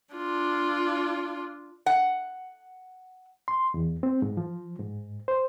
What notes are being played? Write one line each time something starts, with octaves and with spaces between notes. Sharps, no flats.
D4 F4
F#5
C6
E2
C4
G#2
F3
G#2
C5